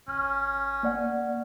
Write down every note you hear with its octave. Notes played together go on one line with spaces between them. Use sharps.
G1 C#4 F6
A#3 D5 F#5